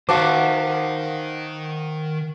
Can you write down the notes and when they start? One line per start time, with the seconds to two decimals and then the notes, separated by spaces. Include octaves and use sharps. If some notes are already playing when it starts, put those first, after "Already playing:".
0.09 D#3 F#4 C5 F5 F#5 A5 D6